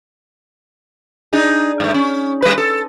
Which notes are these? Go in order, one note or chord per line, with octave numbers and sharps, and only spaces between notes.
D4 D#4 G#4
G2 A3
C#4
G3 B4
A4